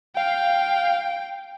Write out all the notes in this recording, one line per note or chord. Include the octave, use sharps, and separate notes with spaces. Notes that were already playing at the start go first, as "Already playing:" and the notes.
F5 G5